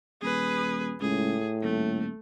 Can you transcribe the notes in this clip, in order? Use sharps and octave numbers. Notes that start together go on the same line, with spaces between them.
D#1 G#4 B4
C#2 A2 G#4
D#1 A3